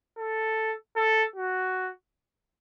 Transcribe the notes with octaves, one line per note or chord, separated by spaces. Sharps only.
A4
A4
F#4